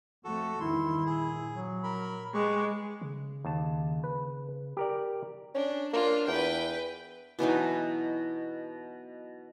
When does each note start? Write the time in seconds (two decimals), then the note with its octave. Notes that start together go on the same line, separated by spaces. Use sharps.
0.24 F2 A3 F#4 A4
0.60 E2 G2 D#3 E4 C6
1.06 A#1 G#4
1.52 F#3
1.84 A#4 B5
2.34 G#3 G4 B4 C#6
3.02 C#3
3.45 D#2 A5
4.04 B4
4.77 G4 A#4 D5
5.55 C#4 D4
5.93 A#3 D4 F4
6.28 E2 B4 G5
7.39 B2 E3 F#3 D#4